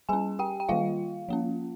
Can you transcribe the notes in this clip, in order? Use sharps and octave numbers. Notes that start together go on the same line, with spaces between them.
G3 C#4 G#4 G#5
G4 G5
G5
D#3 G3 A#3 F4 F5
F3 A#3 C#4